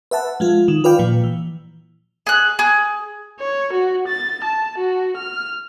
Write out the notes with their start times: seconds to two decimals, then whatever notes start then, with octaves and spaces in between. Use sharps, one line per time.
0.11 B4 E5 F#5 A5
0.40 F3 G#3 F4
0.68 D#3
0.84 F4 B4 D5 F5 G5
0.99 A#2 F3
1.24 E3
2.27 G#4 F#6
2.59 G#4
3.40 C#5
3.73 F#4
4.07 A6
4.44 A5
4.78 F#4
5.17 F6